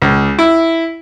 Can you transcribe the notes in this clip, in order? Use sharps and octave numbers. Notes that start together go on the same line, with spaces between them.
C#2
E4